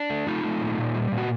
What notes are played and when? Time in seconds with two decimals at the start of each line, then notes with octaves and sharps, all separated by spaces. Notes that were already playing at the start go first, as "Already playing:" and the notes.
Already playing: D4
0.10 A3
0.27 A3 D#4 F4
0.44 A3
0.61 A#2
0.78 A#2
0.95 G3
1.12 A#2
1.18 F#4